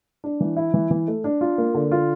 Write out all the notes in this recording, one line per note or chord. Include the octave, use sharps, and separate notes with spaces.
D4
E3
E4
E3
E3
A3
D4
F4
A#3
D3
F4